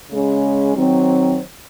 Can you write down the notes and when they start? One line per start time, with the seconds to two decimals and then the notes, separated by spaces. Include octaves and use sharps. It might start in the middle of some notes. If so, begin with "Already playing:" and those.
0.11 C#3 G#3 C#4
0.75 D#3 F#3 C4